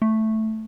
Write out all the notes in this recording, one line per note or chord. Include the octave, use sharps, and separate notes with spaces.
A3